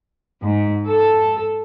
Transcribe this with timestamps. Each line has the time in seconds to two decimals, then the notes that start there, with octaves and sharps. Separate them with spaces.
0.42 G#2
0.88 A4